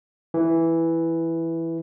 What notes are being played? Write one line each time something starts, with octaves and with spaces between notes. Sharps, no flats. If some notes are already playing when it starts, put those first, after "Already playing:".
E3